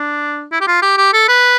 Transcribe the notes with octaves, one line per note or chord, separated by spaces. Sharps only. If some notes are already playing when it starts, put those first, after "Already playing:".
Already playing: D4
E4
G4
F4
G4
G4
A4
B4